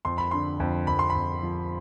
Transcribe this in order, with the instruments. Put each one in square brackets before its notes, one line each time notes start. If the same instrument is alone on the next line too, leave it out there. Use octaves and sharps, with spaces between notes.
[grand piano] F2 C6
B5
D3 C6
F2
F2 B5
C6
B5
F2
F3